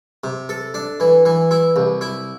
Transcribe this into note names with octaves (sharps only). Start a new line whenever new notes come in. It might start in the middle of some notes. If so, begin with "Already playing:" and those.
C3
A4
D4
E3
E3
E4
C2
E4